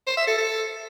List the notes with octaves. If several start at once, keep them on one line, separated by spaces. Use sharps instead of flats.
C5
E5
A4
A4